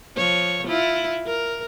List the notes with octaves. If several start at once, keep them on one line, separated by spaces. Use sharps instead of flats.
F3 C#5
E4 F4
A#4